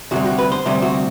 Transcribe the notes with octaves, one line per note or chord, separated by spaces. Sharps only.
D2 C3 G3 F#4
F#4
B4
C5
D2 C3 G3 C5
F#4